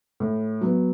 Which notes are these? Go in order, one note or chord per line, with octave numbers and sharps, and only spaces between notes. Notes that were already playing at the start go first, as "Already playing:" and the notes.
A2
F#3 B3